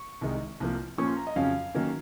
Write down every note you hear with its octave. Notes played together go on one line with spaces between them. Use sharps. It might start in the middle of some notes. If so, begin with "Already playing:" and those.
Already playing: C#6
C2 C3 D#3 G#3 D#4
C2 C3 F3 A#3
A#2 F3 A#3 C#4 C#6
C6
A#5
D#5
F2 C#3 F#3 C#4 F5
D#3 F#3 A#3 C#4